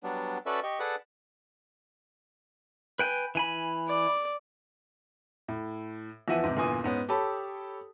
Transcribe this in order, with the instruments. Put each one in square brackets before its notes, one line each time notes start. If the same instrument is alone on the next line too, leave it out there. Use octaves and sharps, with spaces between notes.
[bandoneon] F#3 G3 B3 D4
C#4 F#4 A4 B4 D5 E5
G4 D#5 C#6
G#4 A4 B4 D5 F#5 A5
[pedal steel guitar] B4 G5 G#5
E3 G#5 B5
[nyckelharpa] D5
[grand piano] A2
E2 E3 F3 E5 F#5 D#7
G#2 C3
G1 E2 A#2 G#5 D#6
G#2 B3 C#4
G4 A4 C#5 A5 B5